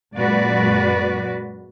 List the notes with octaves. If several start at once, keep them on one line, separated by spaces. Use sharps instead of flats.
F#2 A#2 G#3 F#4 B4 D5